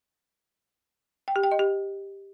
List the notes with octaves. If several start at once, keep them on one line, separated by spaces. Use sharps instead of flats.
G5
G4
G5
D#5
G4